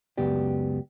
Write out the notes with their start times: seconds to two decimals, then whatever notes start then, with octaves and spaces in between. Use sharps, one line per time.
0.18 C#2 F#2 B3 G4 D5